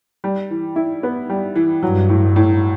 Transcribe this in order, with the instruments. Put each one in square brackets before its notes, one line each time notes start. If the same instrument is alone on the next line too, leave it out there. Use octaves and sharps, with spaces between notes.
[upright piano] G3
E3
E4
B3
G3
E3
[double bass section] G2 [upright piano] F#3
[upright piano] A2
A2